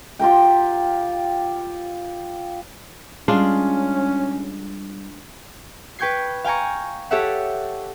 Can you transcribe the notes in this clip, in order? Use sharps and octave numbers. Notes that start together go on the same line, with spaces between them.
F4 G4 A#4 G5
G3 G#3 C#4 D4 F4
B4 G5 C#6 G6 G#6 C7
F5 G5 G#5 A#5 C#6
G4 A4 C#5 E5 F#5